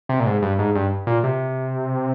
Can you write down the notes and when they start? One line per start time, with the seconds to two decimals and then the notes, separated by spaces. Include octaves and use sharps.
0.09 C3
0.20 A#2
0.26 G#2
0.42 G2
0.59 G#2
0.75 G2
1.07 A#2
1.24 C3